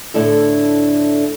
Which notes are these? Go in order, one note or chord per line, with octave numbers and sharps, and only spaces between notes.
A2 D3 D4 E4 A4